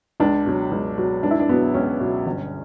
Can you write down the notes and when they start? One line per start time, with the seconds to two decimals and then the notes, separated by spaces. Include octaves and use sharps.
0.20 C#2 D4
0.45 B2 F#3
0.71 C#2
0.97 B2 F#3
1.23 C#2 D4
1.31 E4
1.40 D4
1.49 B2 F#3 B3
1.74 C#2 C#4
2.00 B2 F#3
2.26 G1